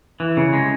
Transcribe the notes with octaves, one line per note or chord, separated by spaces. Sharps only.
E3
C#3
G#3